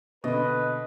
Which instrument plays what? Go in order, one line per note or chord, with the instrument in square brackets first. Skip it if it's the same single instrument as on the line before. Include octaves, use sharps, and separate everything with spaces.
[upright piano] B2 D3 [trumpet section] B4 [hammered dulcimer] D#5